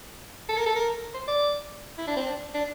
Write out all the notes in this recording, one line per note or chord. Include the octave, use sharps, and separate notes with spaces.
A4
A#4
A4
A#4
C5
D5
E4
D4
C4
D4
D4